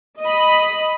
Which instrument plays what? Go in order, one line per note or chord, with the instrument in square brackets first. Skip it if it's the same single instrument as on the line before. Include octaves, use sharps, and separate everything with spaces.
[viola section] D#5 B5